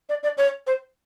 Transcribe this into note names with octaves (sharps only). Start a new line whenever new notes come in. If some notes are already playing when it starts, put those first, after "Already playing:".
D5
D5
C#5
C5